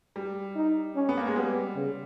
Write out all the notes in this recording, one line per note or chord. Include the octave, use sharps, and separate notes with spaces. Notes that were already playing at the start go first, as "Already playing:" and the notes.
G3
D#4
C#4
B3
A#3
G#3
G3 B3
C#3